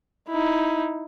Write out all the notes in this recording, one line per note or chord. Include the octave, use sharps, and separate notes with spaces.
D#4 E4